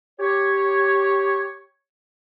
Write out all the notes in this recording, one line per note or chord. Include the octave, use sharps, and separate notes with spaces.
G4 C#5